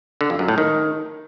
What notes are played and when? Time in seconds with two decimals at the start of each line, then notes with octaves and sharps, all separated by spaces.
0.21 D3
0.30 F2
0.39 F#2
0.48 A2
0.58 D#3